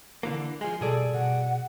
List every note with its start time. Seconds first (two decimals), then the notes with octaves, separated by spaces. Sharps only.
0.23 D3 E3 A#3
0.61 F3 G#3 G#5
0.81 G2 B2 G#4 A4 D5
1.14 B2 F#5